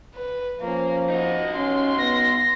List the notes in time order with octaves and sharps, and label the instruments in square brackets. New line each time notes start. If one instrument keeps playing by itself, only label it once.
[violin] B4
[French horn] F3 [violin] A#3 C#4
[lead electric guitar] D#4 F#4 [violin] D#5
[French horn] C#4 [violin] C6
[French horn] B3 [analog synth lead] A#6